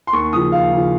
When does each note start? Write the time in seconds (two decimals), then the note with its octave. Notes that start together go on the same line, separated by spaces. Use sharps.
0.07 C6
0.13 D#2 C#6
0.33 C#3 F3 D#6
0.52 D#2 F5
0.72 C#3 F3